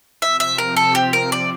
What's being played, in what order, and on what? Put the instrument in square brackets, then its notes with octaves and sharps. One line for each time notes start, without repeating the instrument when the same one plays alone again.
[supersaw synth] C3 F3 C4 [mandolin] E5
[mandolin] E5
A#4
A4
G4
A#4
D5